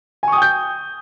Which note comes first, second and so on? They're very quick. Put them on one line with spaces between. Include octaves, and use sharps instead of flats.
G#5 C#6 D#6 G5 G6